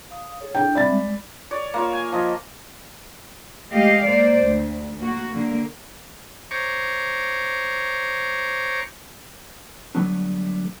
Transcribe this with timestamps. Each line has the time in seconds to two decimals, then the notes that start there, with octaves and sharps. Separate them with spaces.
0.11 F5 D#6
0.40 G#4 A4 C#5
0.55 D4 E4 G5
0.75 G3 C4 D5 E5 B5 A6
0.88 G#3
1.51 C#5 D5
1.74 A#3 F4 C#5
1.93 G#5
2.12 F3 D#5
3.70 G#3 A3 G4 D#5 F5
4.05 A#3 C5 D5
4.46 D2
4.99 A#3 F#4
5.31 D3 A#3
6.51 C5 C#5 A#5 C#6 D6
9.95 D3 F#3 G3 A3 B3 D4